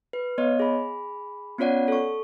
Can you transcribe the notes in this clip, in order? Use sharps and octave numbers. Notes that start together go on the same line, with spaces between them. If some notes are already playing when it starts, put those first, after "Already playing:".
B4
B3 C#5 D#5
G#4 B5
B3 C#4 F4 C#5 D5 F#5
A4 C#6